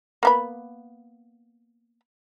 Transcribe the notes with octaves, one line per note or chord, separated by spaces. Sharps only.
A#3 B3 B5